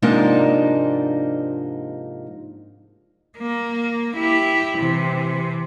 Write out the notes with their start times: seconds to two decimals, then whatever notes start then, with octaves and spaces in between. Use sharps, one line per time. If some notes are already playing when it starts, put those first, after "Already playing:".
0.02 G#2 C3 F3 A#3 D4 D#4
3.37 A#3
4.16 E4 G4
4.79 C3 E3